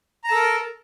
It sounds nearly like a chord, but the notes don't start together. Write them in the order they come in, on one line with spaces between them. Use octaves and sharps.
A#5 A5 A4 A#4